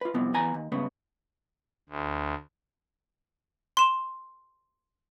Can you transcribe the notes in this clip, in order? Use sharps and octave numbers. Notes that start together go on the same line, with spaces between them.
F4 B4
C2 F2 C3 F3 B3
E2 B3 G#5 A#5
D#2
C#2 G2 C#3 B3
D2
C6 E7